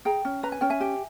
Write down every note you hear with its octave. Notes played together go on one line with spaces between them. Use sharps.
G#4 G5 A#5
C#4
B4 A#5
G#5
C#4 G5
E5 G#5
G4